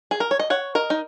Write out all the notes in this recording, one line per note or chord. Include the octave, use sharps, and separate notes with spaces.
G#4
A#4
C#5
D#5
C#5 F#5
A#4 D#5
D#4